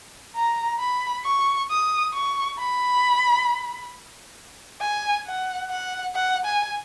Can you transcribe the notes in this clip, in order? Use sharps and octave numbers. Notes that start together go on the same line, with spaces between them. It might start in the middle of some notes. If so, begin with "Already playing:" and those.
A#5
B5
C#6
D#6
C#6
B5
G#5
F#5
F#5
F#5
G#5